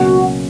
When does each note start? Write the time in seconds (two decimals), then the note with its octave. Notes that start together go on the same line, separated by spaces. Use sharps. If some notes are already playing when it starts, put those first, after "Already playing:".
Already playing: C#2 B2 F#3 A#3 C#4 F#4